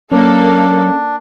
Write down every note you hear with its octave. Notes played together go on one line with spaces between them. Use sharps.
F#3 A#3 C#4 D4 A4